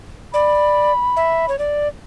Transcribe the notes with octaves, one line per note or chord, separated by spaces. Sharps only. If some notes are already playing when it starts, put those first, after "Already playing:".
D5 B5
E5
C#5
D5